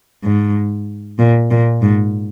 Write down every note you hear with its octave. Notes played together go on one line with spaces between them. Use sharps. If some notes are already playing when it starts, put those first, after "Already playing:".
G#2
A#2
A#2
G#2